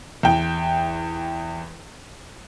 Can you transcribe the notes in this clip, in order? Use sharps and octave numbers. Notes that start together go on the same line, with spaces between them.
E2 G5